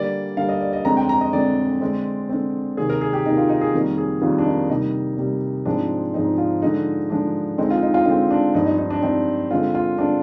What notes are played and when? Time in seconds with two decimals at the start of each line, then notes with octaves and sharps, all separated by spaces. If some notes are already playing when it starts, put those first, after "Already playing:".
Already playing: D3 G3 A#3 D5
0.37 D3 G3 A#3 F5
0.49 D#5
0.61 D5
0.73 D#5
0.85 F2 D3 G#3 C4 A#5
0.97 G5
1.09 A#5
1.21 D#5
1.33 F2 D3 G#3 C4 D5
1.81 D3 G#3 C4
2.29 D3 G#3 C4
2.77 C3 D#3 A#3 G#4
2.90 A#4
3.01 G#4
3.13 G4
3.25 C3 D#3 A#3 D#4
3.37 F4
3.49 D#4
3.61 G#4
3.73 F2 D#3 G3 A#3 A#4
3.98 G#4
4.22 F2 D#3 G3 A#3 F4
4.38 D4
4.46 D#4
4.69 C3 G3 A#3 D#4
5.17 C3 G3 A#3
5.65 G#2 F3 G#3 C4 D4
6.14 G#2 F3 G#3 C4 D#4
6.38 F4
6.62 D3 F3 G#3 D#4
7.10 D3 F3 G#3 D4
7.58 D3 G#3 C4 D#4
7.70 F4
7.82 D#4
7.94 F4
8.06 D3 G#3 C4 F4
8.31 D4
8.55 G2 F3 C4 D#4
8.66 D#4
8.78 D#4
8.90 D4
9.02 G2 F3 C4 D#4
9.50 D3 G#3 C4 F4
9.75 F4
9.98 D3 G#3 C4 D4